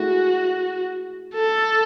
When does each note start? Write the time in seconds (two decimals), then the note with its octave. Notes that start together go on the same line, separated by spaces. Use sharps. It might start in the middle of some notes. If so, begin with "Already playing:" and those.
Already playing: A3 E4 F#4 G#4
1.35 A4